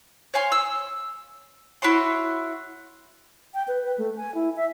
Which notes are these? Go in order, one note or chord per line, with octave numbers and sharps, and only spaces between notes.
C#5 F5 G#5 C6
E6
E4 F#4 C#5 C6
G5
B4
B4
A3
G#5
E4
E5